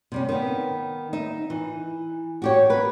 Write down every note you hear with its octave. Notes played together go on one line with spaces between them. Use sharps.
C3 G3 C#4
D#3 B3
D#4 E5
E3
F#4 G4 C#5
A#4 B4